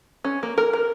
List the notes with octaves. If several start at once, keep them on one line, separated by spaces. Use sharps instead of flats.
C#4
A#3
A#4
A#4